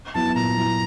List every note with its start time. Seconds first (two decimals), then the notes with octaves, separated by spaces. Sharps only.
0.14 F#3 B3 E4 A5
0.35 A#2 A#5
0.56 F#3 B3 E4